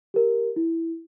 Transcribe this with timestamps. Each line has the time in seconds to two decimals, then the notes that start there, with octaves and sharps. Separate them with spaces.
0.14 G4 A#4
0.56 E4